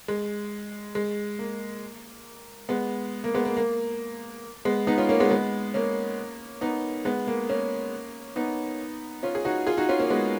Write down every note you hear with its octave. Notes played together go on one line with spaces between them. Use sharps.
G#3
G#3
A#3
G#3 B3
A#3
G#3 B3
A#3
A#3
G#3 B3
B3 D#4
C#4 F4
A#3 C#4
G#3 B3
G#3 B3
A#3 C#4
B3 D#4
G#3 B3
A#3
A#3 C#4
B3 D#4
C#4 F4
G#4
D#4 F#4
F4 G#4
D#4 F#4
C#4 F4
A#3 C#4
G#3 B3